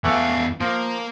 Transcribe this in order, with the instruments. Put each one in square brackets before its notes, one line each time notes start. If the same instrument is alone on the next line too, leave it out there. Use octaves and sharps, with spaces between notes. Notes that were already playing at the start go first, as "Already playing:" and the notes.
[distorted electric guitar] E2 F5 [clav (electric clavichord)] E3 A3 F#5
[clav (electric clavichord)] F3 [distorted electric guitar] A#3